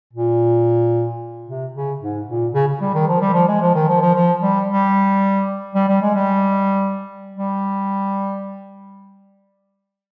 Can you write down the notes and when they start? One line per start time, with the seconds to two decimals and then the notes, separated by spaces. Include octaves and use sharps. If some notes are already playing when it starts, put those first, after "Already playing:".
0.13 A#2
1.47 C3
1.74 C#3
2.01 G#2
2.27 A#2
2.54 C#3
2.68 C#3
2.81 G3
2.94 D#3
3.08 F3
3.21 G3
3.34 F3
3.48 G#3
3.61 F3
3.75 D#3
3.88 F3
4.01 F3
4.15 F3
4.42 G3
4.69 G3
5.75 G3
5.88 G3
6.02 G#3
6.15 G3
7.35 G3